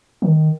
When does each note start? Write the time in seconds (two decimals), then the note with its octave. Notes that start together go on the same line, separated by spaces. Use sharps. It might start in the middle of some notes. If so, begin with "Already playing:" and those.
0.22 D#3